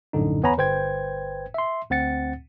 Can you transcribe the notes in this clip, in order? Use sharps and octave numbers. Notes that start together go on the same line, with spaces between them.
A#1 F#2 A2 D3 D#4
E2 B3 C#5 G#5 A#5 B5
G1 B4 C5 G5 G#6
E5 C6
D2 C4 F#5 A6 C#7